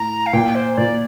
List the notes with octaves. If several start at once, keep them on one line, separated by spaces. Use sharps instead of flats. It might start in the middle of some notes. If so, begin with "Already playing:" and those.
Already playing: A2 A#5
F5
A#2 G5
C5
A#2 D5